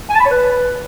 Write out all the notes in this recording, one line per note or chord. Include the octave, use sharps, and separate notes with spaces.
G#5
A5
B5
C#5
B4